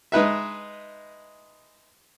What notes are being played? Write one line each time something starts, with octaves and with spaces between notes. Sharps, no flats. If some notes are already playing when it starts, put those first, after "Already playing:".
G#3 D#4 B4 E5